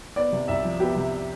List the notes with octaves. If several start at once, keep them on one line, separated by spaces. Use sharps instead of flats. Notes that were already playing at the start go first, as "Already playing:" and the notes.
B3 D5
C3
C2 E5
F3
B3 G4
C3